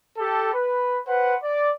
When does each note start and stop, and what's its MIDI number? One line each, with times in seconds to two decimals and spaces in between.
0.16 0.51 67
0.16 0.51 69
0.53 0.97 71
1.06 1.33 71
1.06 1.33 72
1.06 1.33 78
1.42 1.70 74